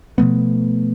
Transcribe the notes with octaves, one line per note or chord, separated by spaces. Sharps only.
B2 F3 A3 B3